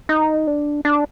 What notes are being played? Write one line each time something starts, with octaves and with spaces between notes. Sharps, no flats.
D#4
D4
D4